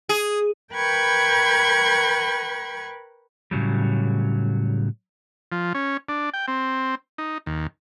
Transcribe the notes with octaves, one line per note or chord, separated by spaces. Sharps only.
G#4
A#4 B4 G5 B5 C#6 G#6
A2 C#3 F#3 G3
F3
C#4
D4
G5
C4
D#4
D#2